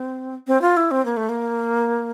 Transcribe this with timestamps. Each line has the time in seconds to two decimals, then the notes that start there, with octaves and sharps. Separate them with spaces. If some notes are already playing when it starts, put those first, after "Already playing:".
Already playing: C4
0.47 C4
0.61 F4
0.77 E4
0.91 C4
1.05 A#3
1.17 A3
1.29 A#3